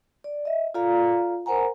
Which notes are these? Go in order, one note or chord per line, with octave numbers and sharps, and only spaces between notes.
D5
D#5 E5
F4 A4 D5 F5 A#5
A#4 C5 F#5 G#5 A#5